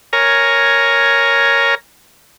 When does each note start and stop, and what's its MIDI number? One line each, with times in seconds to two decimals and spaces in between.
0.13 1.75 70
0.13 1.75 73
0.13 1.75 80
0.13 1.75 82